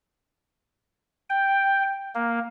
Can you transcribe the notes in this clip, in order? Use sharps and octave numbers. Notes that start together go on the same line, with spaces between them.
G5
A#3